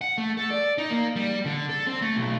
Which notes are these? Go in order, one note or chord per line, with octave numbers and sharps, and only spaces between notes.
F#5
A3
A4
D5
D#4
A#3
G3
D3
A4
C4
A3
B1